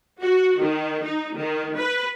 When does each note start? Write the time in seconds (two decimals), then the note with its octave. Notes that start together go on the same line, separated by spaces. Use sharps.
0.22 F#4
0.60 D#3
1.05 D#4
1.36 D#3
1.77 B4